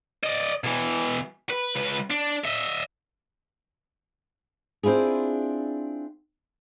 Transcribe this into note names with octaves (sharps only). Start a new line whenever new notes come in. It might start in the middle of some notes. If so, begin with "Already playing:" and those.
D5 D#5
B2 E3
B4
C#2 B4
D4
D#5 E5
C4 D4 E4 F4 G#4